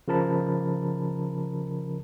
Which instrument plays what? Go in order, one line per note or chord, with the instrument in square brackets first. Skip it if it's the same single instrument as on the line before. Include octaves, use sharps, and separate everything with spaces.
[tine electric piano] C#3 F3 A#4 A5 B5